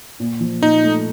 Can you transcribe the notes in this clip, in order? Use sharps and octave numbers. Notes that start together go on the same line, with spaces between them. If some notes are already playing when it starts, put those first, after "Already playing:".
A#2
F3
A#2 D#4
A3